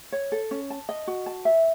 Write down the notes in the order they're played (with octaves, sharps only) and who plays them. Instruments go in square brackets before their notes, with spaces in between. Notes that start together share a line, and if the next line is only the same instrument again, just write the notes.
[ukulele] C#5
A4
C#4
A5
D#5
F#4
A5
E5